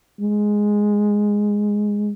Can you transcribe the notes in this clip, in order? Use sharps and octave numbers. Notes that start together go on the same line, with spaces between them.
G#3